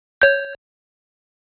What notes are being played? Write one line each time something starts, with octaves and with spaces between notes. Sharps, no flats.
C#5 G6